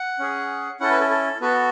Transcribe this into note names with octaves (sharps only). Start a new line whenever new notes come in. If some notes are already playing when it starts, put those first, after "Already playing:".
Already playing: F#5
C#4 G#4
C#4 E4 A4 F#5
B4
A4
A4
B3 F#4 A4 B4